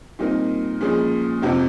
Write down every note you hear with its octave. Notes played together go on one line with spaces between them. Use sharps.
A#2 G3 C4 D#4 A#4
A#2 F3 G#3 C#4 G#4
F2 C3 F3 C4